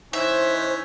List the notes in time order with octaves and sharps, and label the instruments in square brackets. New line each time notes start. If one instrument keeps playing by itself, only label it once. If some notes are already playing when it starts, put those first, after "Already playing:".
[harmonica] E3 C#4 [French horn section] D#4 [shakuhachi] C5 [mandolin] E5